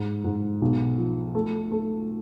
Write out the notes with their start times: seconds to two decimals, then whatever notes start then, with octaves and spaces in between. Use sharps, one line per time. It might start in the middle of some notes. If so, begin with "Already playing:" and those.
Already playing: G#2
0.24 G#2
0.62 B1
0.98 F3
1.35 A3
1.71 A3